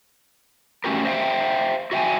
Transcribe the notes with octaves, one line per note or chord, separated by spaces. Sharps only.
A3 C#4 F#4 G4 A#4
C5 E5 F5 G5
F#4 E5 G5 G#5